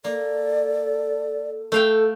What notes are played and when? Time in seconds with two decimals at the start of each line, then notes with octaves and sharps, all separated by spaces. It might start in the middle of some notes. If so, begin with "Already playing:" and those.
0.05 A#3 A4 D5
1.72 A3 A4 F5 G5